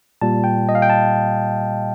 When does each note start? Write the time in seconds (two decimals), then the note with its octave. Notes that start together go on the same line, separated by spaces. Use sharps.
0.21 A#2 G3 A5
0.44 G5
0.69 D#5
0.75 F5
0.82 G5
0.90 A5